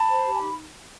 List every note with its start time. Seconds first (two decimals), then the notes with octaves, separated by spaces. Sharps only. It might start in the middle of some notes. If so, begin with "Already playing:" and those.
Already playing: A5 B5
0.09 C5
0.26 G4
0.34 G#5
0.42 D#4